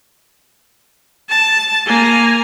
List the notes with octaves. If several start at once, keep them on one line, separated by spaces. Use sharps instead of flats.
A5
A#3 G#5